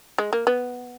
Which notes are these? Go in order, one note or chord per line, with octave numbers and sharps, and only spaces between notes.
G#3
A#3
B3